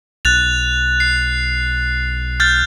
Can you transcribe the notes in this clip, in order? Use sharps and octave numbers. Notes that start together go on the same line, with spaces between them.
B1 F#6 A6 F7
C7
F6 G6 A6